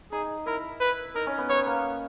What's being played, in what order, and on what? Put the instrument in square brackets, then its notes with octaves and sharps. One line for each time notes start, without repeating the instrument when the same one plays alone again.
[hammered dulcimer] D#4 [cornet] G#4
[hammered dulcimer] E4 [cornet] A#4
[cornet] B4
[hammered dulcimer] D#4 [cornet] A#4
[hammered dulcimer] C#4
B3
[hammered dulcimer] B3 [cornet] C#5
[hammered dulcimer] A#3